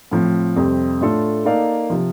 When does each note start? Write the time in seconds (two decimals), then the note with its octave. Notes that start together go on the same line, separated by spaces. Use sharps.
0.11 A2 F3 C4
0.56 F2 C3 G3 C4
1.01 A2 A3 D4 F4 A4
1.45 A#3 D#4 A4 D5 F5
1.90 C3 F3